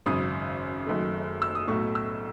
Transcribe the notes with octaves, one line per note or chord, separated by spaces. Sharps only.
G#1 F#2 C#3 D#6
F#1 F#2 D#3 A3
E6
D#6
B1 A2 F#3 A3 C#6
E6